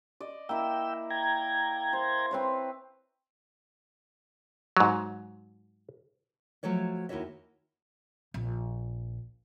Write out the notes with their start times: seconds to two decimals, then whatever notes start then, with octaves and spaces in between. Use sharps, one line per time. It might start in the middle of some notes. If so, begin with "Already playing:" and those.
0.20 D5 D#5
0.49 A#3 E4 G5 E6
1.10 G5 A#5 G#6
1.93 C5
2.31 C4 B4 C#5
4.77 G#2 F#3
6.63 F3 F#3 A3 C#5 E5
7.09 D#2 G#2 E4 F#4 C#5 E5
8.34 A#1